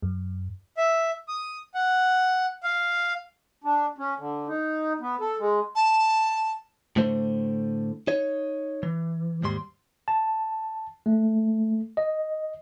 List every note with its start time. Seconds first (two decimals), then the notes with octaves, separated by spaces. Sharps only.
0.02 F#2
0.77 E5
1.28 D#6
1.74 F#5
2.63 F5
3.64 D4
3.98 C#4
4.18 D3
4.48 D#4
5.00 B3
5.21 A4
5.39 G#3
5.75 A5
6.96 A2 D3 A3 C5
8.07 D#4 C#5
8.83 E3
9.42 D#2 G#2 G3 C6
10.08 A5
11.06 A3
11.97 D#5